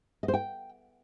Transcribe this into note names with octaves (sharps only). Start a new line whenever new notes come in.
D#5
C5
G5